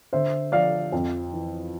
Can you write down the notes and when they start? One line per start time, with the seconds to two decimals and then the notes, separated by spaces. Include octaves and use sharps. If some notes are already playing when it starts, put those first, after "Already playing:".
0.13 D3 C5 E5
0.52 F3 D5 F5
0.93 F2
1.33 E3